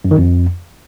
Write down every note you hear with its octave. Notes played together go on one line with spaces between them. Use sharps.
F#2
D#3
F2